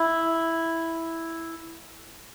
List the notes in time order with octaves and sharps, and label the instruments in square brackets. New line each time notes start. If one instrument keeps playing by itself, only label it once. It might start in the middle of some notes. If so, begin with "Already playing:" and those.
Already playing: [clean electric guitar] E4